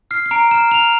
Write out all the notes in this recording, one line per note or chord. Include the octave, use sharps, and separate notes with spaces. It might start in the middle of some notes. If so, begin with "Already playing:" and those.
F6 C7
C7
A#5 D7
F6 E7
F6 F7